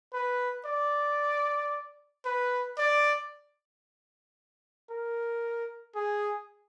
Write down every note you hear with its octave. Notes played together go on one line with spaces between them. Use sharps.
B4
D5
B4
D5
A#4
G#4